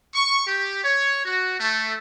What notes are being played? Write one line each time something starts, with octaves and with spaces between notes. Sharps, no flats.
C#6
G4
C#5
F#4
A3